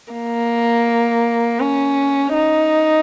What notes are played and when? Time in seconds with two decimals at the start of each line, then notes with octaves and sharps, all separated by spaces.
0.13 A#3
1.60 C#4
2.34 D#4